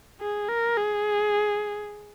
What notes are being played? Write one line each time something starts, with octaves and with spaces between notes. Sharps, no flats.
G#4
A#4
G#4